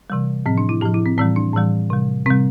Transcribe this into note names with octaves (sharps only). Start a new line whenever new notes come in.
C3 E3 G3
A2 F3 C4
D4
E4
A2 F3 G4
E4
C4
A2 E3 G3 C4
D4
A2 E3 G3
C3 G3
C3 G3 C4